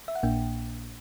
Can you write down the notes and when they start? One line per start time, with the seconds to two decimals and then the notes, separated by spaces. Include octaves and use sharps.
0.08 E5
0.15 F#5
0.23 A#1 A#2 A#3 D4 G5